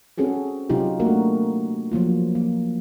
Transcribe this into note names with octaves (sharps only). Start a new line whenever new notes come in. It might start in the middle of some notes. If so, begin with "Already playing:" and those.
C4 C#4 F#4 G#4 A4
C3 F#3 D#4 F4 G4
A3 A#3 D4 F#4 A#4
F3 F#3 A#3 F4
A#3